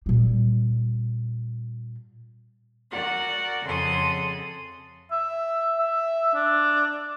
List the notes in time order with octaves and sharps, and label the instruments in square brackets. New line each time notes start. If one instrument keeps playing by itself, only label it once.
[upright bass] A#2 G3
[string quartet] F#4 A#4 D5 F#5
F2 C#3 A4 F#5 C6 D#6
[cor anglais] E5
E5
D4